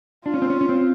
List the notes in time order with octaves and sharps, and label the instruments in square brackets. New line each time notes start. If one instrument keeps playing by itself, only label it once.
[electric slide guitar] D4 [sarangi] F4
[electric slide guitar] C#4
C4
C#4
C#4
C4